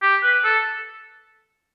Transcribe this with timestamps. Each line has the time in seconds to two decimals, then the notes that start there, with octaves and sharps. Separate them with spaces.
0.02 G4
0.23 B4
0.45 A4